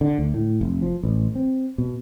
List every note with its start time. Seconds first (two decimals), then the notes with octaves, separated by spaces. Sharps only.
0.01 D3
0.18 D2
0.34 A2
0.61 F1
0.82 F3
1.03 A1
1.35 C4
1.78 B2